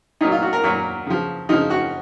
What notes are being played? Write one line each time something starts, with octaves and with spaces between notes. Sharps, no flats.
A#2 F#3 D#4
F4
F#4
A#4
A#2 F#3 F#4
C#3 F3
C#3 F3 D#4
F#4